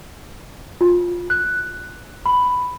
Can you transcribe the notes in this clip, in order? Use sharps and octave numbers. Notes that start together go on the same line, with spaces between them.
F4
F#6
B5